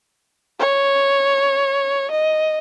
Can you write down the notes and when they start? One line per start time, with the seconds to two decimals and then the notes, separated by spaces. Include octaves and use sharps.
0.59 C#5
2.11 D#5